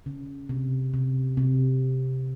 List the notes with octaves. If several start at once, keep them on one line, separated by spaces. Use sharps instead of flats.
C#3
C3
C3
C3